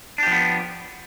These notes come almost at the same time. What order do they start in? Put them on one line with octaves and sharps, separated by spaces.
D4 G4 F3 B3